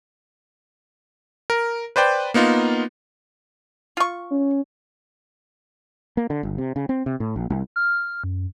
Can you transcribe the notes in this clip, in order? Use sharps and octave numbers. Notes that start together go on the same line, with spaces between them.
A#4
B4 C5 D5 G5
A#3 B3 D#4 F4
F4 C#6
C#4
A#3
D3
G1
C3
C#3
C4
C3
A2
A#1
C2
F6
F#2